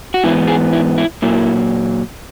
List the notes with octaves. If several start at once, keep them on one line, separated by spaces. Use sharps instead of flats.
F#4
G#2 E3 B3 E4
G#4
E4
E4
A#2 F#3 A#3 E4